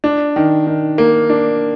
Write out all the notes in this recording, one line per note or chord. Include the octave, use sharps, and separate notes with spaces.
D4
D#3
D#3
A#3
D4